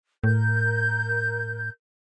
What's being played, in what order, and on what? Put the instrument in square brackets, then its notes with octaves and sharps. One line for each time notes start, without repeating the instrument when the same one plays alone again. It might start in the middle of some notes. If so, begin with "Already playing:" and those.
[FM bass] A2 [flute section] A#4 G6